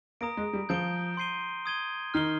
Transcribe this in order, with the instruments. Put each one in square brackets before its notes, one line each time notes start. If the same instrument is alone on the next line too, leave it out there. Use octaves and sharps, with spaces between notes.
[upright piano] A#3 [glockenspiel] A#5 D#6 A#6 D7
[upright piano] G#3
G3
[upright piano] F3 [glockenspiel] G6 D7 G7
[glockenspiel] C6 G6 C7 D#7 G7
D#6 G#6 D#7 G7
[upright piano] D#3 [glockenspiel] F6 C7 G7